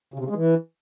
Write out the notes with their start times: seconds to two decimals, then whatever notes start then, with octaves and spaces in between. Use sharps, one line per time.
0.14 C#3
0.19 C3
0.25 C#3
0.30 G#3
0.36 E3